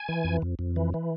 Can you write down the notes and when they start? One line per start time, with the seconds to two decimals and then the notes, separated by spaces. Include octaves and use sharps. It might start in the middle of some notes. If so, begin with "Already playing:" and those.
Already playing: G#5
0.08 E3
0.24 F2
0.42 F2
0.59 F2
0.76 E3
0.94 E3